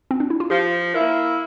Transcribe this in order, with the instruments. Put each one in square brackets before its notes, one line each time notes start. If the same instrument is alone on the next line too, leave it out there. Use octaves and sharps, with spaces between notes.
[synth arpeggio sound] C4
D4
E4
F4
[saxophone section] F3 [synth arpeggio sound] G4
[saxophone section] A#3 E4 [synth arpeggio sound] A#4